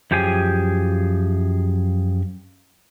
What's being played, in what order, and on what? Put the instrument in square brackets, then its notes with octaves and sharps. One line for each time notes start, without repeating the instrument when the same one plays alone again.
[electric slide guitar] F#2 F3 G4 G#4 G#5